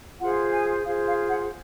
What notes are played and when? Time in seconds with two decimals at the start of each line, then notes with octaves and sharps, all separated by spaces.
0.20 F4 G#4 C5 F#5
0.52 G#5
0.85 F4 G#4 C5 F5
1.07 F5
1.29 F#5